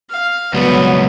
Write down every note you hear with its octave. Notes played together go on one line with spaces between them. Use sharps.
F5
C#2 F#3 G3 B3